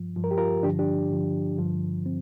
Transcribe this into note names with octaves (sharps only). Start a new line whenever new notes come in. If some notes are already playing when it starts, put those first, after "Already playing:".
Already playing: G2 F3
G2 F3
A#4
G4
F4 A#4
G2 D3 F3 D4 G4
D4 G4
G2 D3 F3
G2 D3 F3
C4